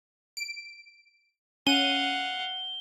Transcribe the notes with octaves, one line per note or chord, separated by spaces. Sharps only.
D7
C#4 F5 F#5 D#7 G7